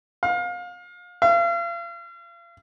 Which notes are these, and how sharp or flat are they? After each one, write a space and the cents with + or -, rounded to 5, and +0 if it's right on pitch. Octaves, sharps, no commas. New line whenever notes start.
F5 +30
F5 -40